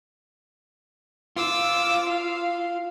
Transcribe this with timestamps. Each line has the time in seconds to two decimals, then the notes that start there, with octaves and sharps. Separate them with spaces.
1.36 F4 D6 E6
2.08 F5